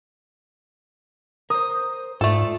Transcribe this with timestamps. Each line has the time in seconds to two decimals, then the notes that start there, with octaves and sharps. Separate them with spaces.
1.50 A#4 C5 D#6
2.21 G#2 A3 F4 A4 D5